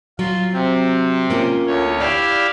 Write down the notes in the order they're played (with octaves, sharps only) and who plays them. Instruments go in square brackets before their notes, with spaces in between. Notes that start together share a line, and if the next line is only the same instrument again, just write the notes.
[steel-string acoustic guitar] F#3 [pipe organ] F4
[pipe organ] C3 C4
[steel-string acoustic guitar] A#3 C#4 F4
[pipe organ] D2 C#5
[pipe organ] E4 G4 F5 [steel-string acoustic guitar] D5